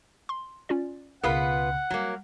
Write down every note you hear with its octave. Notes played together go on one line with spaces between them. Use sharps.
C6
C#4 F4 D5
C#2 B2 B3 F4 G#4 A#4 B4 F#5
F#3 G3 A#3